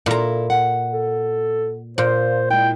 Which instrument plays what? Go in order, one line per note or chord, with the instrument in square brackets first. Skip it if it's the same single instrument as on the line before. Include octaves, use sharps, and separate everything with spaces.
[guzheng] A#2 A#5 [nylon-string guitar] E4 A4
[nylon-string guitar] F#5
[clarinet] A4
[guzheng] A#2 [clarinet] C5
[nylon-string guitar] G#3 E4 [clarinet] G5